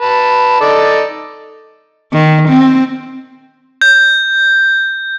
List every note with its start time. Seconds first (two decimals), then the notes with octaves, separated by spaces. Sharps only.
0.01 B4 A5
0.61 D#4 A4 D5
2.13 D#3
2.49 C4
3.81 G6